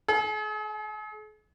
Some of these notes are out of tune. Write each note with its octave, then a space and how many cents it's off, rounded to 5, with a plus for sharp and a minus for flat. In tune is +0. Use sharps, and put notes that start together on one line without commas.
G#4 +45 G#5 +0